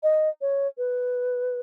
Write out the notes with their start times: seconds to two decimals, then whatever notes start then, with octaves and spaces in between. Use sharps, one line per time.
0.03 D#5
0.41 C#5
0.78 B4